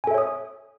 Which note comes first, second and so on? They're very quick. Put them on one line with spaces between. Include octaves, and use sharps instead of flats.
G#5 A4 E5 C#5 D#6